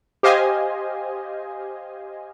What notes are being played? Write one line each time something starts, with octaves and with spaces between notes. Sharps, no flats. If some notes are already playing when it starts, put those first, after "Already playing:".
G4 C5 D#5 F5 G#5